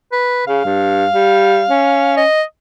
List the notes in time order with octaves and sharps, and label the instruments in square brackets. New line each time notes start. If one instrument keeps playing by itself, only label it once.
[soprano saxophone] B4
[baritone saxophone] C#3 [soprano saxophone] F5
[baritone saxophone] G2
G3
C#4
[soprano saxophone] D#5